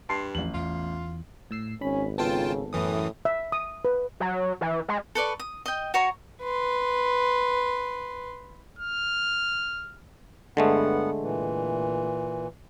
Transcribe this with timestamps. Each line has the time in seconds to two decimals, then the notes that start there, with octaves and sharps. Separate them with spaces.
0.09 G2 A5 C6 C7
0.35 A1 E2 F3 F#7
0.54 E2 E3 F4
1.51 A2 E6 C7
1.82 G#1 C#4 B5
2.18 C#3 B3 F4 A4 G5 A5
2.73 F#2 A2 E3 D#6
3.25 E5
3.52 D#6
3.85 B4
4.20 F#3
4.61 E3
4.88 G#3
5.15 A4 B4 D5 C#6
5.39 D#6
5.66 D#5 G5
5.94 F#4 C#5 A#5
6.43 B4 C6
8.79 F6
10.57 G2 D3 G#3 A3 B3 F#5
11.20 A#2 E3